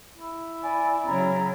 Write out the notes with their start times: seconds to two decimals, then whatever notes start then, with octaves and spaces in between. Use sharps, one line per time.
0.17 E4
0.63 D5 G#5
1.07 C#3 F#3 A#5